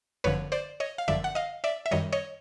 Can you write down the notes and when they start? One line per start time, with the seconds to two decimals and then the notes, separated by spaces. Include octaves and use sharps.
0.24 G1 F#2 D3 F3 B4 C#5
0.52 C5 D5
0.80 C#5 D#5
0.98 F5
1.08 G1 F#2 D3 F3 D5 E5
1.24 F#5
1.35 D#5 F5
1.64 D5 E5
1.86 E5
1.91 F#2 D#3 G3 C#5 D#5
2.13 C#5 D#5